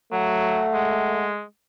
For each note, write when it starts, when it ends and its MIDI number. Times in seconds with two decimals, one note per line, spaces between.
0.12 0.67 54
0.12 1.31 57
0.12 1.24 78
0.74 1.43 56